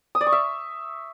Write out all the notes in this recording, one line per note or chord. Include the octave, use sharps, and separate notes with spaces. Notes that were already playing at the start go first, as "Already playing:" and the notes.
D#6
D5
C#6
E5